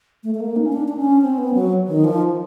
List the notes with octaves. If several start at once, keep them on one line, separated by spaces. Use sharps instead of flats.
A3
A3
A#3
D#4
C#4
D4
D4
C#4
C4
B3
F#3
D#3
F3